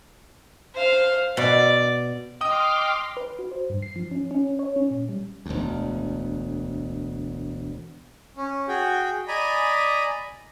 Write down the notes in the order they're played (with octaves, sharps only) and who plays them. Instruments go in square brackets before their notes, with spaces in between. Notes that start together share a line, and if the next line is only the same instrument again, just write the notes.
[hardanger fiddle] C5 F5
[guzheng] B2 [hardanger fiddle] D5
[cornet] D#5 [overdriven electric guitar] G5 [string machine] C6 D6 F6 [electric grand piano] D#6
[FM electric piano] B4
F#4
C5
G2
C7
F3
C#4
C#4
C#5
C#4
A#2
G3
[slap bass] E1 D2
[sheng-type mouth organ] C#4
F#4 G#4 G5
D5 D#5 G#5 A#5 B5